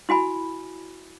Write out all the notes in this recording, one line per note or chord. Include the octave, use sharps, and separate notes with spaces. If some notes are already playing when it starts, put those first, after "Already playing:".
E4 F#4 G#5 B5